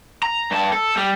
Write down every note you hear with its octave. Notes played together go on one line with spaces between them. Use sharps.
A#5
G2 A5
A4
G3